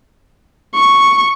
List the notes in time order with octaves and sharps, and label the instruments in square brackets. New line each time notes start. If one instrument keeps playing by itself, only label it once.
[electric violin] C#6